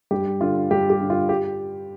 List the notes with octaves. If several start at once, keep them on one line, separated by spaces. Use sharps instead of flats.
G2 G4
D3 F4
G2 G4
G4
D3
F4
G4